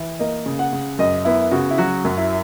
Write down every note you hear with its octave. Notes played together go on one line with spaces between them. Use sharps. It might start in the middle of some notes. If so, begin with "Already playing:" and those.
Already playing: E3
A#3 D#5
C#3
F#5
C#3
F#2 D#5
B3 E4
C#3 F#4
E4
F#3 F#4
F#2
E4